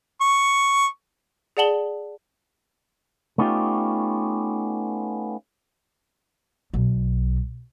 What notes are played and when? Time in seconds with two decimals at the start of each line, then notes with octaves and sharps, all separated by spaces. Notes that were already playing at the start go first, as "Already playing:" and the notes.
0.21 C#6
1.57 G#4 D5 F#5 A5 F#7 G7
3.38 A3 B3 C#4 D#4 F4 G4
6.74 B1